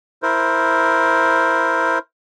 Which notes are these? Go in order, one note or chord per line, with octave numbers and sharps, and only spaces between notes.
E4 A#4 C5